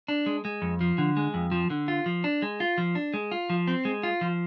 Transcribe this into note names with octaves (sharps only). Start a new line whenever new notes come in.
D4
G#3
G#3
F2
F3
D3
G#3
F2
F3
D3
F4
F3
D4
G#3
F4
F3
D4
G#3
F4
F3
C4
G#3
F4
F3